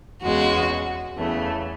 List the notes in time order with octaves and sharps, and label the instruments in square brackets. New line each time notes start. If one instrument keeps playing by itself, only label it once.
[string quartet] E2 C#3 G#3 F#4
E2 C#3 E3 A3